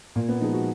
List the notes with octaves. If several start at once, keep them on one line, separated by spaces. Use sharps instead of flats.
A#2 A#3
B3
F3 G#3 D#4
F#4